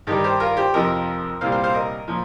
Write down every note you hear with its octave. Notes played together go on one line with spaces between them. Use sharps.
G2 D#3 G3 D#4 G4
G4 C5
F4 A#4
G4 C5
F2 C3 F3 A#4 D#5
C2 A#2 G3 C5 F5
C5 F5
C5 F5
A#4 D#5
A#2 F3